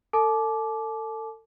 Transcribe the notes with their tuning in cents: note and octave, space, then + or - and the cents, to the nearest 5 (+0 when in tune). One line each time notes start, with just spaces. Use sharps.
A4 +35 A5 -40 D6 +0